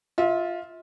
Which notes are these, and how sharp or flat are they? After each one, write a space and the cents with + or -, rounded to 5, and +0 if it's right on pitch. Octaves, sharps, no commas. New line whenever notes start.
F4 +0 E5 -35